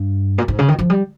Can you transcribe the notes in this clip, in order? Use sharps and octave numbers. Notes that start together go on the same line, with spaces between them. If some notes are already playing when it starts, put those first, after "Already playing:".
Already playing: G2
A#2
G#2
C#3
D#3
F3
G3